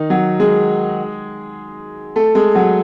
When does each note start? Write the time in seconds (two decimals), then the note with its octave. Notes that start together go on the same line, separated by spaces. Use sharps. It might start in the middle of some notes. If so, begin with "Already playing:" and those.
Already playing: D#3 D#4
0.10 F#3 F#4
0.40 G#3 G#4
2.16 A3 A4
2.35 G#3 G#4
2.55 F#3 F#4